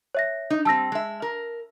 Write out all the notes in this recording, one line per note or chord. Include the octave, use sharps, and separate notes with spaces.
C#5 E5 A#6
D#4
G3 C4 A5 E6 A#6
G#3 E5
A#4